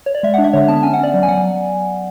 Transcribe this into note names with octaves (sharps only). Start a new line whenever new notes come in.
C#5
D5
G#3 E5
D4 F#5
E5
D3 C#5
B3 A5
C#4 G#5
F#5
C#4 D5
F#3
G#5
F#3 F#5